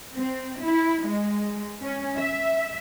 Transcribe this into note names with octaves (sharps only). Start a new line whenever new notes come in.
C4
E4
G#3
C#4
E5